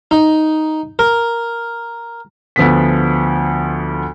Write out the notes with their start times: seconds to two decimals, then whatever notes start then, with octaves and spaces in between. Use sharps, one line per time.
0.11 D#4
0.99 A#4
2.56 D2 F3 B3 B6